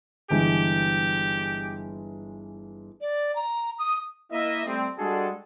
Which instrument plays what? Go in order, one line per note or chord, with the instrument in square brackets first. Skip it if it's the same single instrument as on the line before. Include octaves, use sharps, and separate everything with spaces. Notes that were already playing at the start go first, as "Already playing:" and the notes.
[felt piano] G1 E3 G#3 [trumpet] G4
[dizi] D5
A#5
D#6
[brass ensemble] A#3 E4 D#5 E5
G3 A3 C4
G3 G#3 D4 F#4 G#4 A4